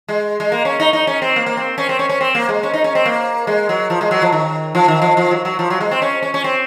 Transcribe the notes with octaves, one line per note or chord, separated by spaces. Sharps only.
G#3
G#3
A#3
C#4
D#4
D#4
C#4
C4
A#3
A#3
C4
C#4
C4
C#4
C#4
C4
A#3
G#3
C#4
D#4
C#4
C4
A#3
G#3
F#3
F3
G#3
F#3
F3
D#3
F3
D#3
F3
F3
F#3
F#3
F3
F#3
G#3
C4
C#4
C#4
C#4
C4